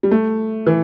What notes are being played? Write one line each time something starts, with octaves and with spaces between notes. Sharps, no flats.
G3
A3
E3